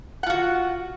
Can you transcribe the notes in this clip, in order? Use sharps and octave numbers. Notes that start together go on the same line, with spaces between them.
F4 F#4 F#5